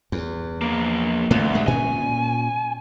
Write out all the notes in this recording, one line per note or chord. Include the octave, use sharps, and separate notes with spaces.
E2
F3 A#3
D2 A#2 A3 A#3
G2 G#3
A#2 C#4 G#5